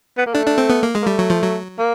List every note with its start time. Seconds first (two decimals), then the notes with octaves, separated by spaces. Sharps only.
0.18 B3
0.26 A#3
0.34 A3 D4
0.46 D4
0.58 C4
0.70 B3
0.83 A#3
0.95 G#3
1.02 A#3
1.06 G3 A3
1.19 F#3
1.30 F3
1.42 F#3
1.79 A#3